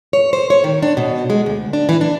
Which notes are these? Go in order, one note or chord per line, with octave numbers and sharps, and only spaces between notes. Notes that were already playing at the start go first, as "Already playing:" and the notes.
C#5
C5
C#5
D#3
D4
B2
G#3
D2
D4
E3
D4